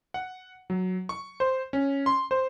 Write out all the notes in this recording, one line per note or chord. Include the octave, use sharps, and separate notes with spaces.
F#5
F#3
C#6
C5
C#4
C6
C5